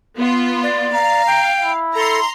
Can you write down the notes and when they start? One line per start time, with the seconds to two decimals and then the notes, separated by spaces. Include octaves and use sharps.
0.17 B3 F4
0.63 D5
0.93 F5 A#5
1.27 G5
1.63 E4
1.95 A4 A#5 C6